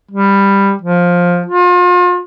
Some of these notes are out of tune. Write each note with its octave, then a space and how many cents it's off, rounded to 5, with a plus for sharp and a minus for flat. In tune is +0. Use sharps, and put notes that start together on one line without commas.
G3 +15
F3 +10
F4 +35